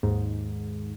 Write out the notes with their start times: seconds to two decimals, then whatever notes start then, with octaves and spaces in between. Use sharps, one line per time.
0.03 D#2 G#2